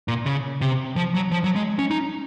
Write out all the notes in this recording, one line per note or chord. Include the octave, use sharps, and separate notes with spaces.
A#2
C#3
C3
F3
F#3
F3
F#3
G#3
C#4
D#4